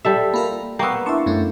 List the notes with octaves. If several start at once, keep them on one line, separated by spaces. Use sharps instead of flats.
G3 A4 E5
A#3 F4 A#4 B5
A#3 B3 G5 C#6 E6
D4 E4 E5 A5 C6 C#6
F#2 A3 C#4